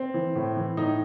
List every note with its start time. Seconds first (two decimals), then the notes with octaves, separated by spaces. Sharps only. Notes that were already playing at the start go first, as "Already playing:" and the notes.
Already playing: C4
0.14 E3
0.35 A2
0.57 E3
0.77 A2 D#4